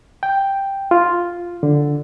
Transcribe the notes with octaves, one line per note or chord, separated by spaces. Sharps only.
G5
F4
D3